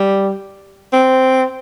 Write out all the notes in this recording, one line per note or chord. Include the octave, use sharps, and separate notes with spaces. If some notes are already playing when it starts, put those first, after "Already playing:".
Already playing: G3
C4